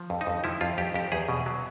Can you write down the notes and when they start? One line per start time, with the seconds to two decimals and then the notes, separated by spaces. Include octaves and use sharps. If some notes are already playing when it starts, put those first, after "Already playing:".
Already playing: F3
0.10 F2
0.21 D#4
0.27 F2
0.44 F3 E4
0.61 F2 F4
0.78 F2 G4
0.94 F2 G4
1.12 E2 G#4
1.29 B2
1.46 F#3